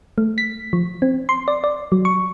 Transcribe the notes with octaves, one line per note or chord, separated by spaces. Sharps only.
A3
B6
F3
C4
C6
D5
D5
F#3
C#6